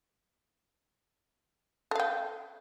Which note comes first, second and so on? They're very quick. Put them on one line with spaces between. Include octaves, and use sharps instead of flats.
A4 F5 G5